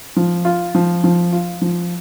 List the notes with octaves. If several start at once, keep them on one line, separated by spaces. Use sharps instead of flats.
F3
F4
F3
F3
F4
F3